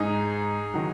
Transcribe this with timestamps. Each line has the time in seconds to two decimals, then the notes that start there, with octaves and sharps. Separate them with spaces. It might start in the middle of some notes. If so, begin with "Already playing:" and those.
Already playing: G#2 G#3 D#4 G#4
0.74 D#3 F#3